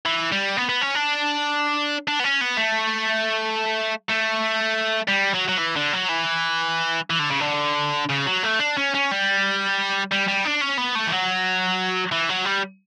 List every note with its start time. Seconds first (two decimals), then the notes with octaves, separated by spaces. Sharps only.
0.06 E3
0.32 G3
0.57 B3
0.69 B3
0.81 C#4
0.95 D4
2.08 D4
2.20 B3
2.24 C#4
2.41 B3
2.57 A3
4.09 A3
5.08 G3
5.34 F#3
5.49 F#3
5.58 E3
5.76 D3
5.93 F#3
6.09 E3
7.10 E3
7.19 D3
7.30 C#3
7.40 D3
8.10 C#3
8.27 F#3
8.44 A3
8.60 D4
8.77 C#4
8.94 C#4
9.11 G3
10.11 G3
10.28 G3
10.45 D4
10.61 C#4
10.77 B3
10.95 A3
11.07 E3
11.12 F#3
12.12 E3
12.29 F#3
12.45 G3